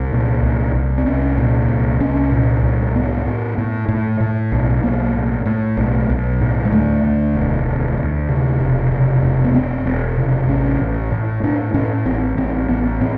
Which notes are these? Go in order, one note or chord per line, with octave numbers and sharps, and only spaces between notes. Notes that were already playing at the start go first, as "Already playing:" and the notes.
Already playing: C2
A#2
C2
C2
C4
C2 C#4
A#2
C2
C2 C#4
A#2
C2
A2 B3
A2
A2
A2
A2
B1
B1 A#3
A2
A2
B1 A3
B1
A2
G#3
D2 A3
D2
E1
D2
D2
C3
E1
C3
E1
B3
E1 C4
E1
C3
A1 C#4
A1
A2
A2 D4
A2 C#4
A1 C4
A1 C4
A1 B3
A2 C4